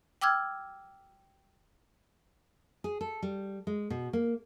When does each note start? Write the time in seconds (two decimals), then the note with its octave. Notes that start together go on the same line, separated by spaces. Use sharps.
0.21 G5 D6 E6 F6 G#6
2.84 G#4
3.01 A4
3.22 G3
3.67 G#3
3.90 B2
4.13 A#3